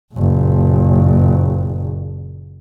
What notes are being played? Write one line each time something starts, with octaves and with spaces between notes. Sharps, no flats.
F#1 A#2